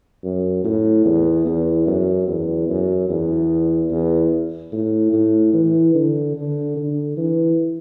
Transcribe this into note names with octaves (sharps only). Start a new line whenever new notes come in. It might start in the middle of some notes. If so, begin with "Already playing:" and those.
F#2
A2
E2
E2
F#2
E2
F#2
E2
E2
A2
A2
E3
D3
D3
D3
E3